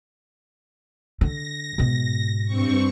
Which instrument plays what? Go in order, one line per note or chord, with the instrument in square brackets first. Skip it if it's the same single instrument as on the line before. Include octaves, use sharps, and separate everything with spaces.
[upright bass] D3 [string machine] A#6
[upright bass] G#2 B2
[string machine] G2 C4 C#6